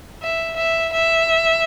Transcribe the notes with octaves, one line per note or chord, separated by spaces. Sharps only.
E5
E5
E5